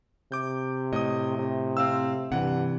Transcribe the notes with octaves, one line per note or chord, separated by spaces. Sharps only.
C3 D6 G6
A2 D#5 D#6
C3
C4 F5 E6
G2 C3 E3 F#5